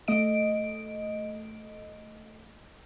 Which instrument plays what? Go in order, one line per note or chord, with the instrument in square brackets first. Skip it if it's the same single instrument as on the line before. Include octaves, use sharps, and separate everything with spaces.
[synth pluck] A3 D#5 D7